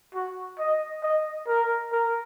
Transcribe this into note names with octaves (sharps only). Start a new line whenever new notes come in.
F#4
D#5
D#5
A#4
A#4